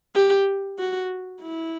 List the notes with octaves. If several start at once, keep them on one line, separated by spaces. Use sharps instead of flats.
G4
F#4
E4